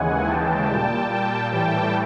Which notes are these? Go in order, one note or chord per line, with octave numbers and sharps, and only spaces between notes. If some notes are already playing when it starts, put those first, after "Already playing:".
Already playing: D#2 C#3 E3 G#3 F#5 G#5
G5 A5
A#2 G3
G5 A5
A2 E3 G3 G5 A5